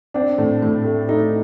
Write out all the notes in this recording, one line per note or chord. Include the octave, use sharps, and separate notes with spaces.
C4 D4
A2
A2
A3
A3 D#4